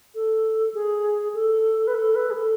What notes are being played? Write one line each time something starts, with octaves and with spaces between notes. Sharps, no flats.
A4
G#4
A4
B4
A4
B4
G#4
A4